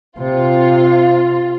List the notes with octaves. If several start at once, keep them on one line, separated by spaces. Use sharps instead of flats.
C3 F4